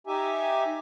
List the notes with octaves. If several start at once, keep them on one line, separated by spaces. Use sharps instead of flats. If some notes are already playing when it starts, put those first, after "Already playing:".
D#4 G4 E5 G#5